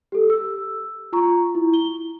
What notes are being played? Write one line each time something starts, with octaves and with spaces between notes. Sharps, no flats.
G4 A4
E6
F4 A#5 C#6
E4
G7